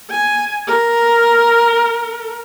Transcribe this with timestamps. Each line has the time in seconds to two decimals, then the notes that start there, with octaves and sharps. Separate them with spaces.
0.10 G#5
0.68 A#4